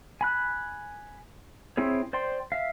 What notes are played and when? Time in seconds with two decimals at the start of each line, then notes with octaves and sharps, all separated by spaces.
0.21 G#5 B5 F#6
1.77 C4 E4 G#4 C#5
2.13 C5 D5 G5 C6
2.52 E5 F5